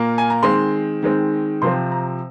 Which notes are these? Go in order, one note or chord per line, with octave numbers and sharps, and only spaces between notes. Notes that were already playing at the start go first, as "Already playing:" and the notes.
Already playing: A#2 A#3
G#5
A#5
D#3 G#3 C4 C6
D#3 G#3 C4
C3 F3 C4 C6
A#5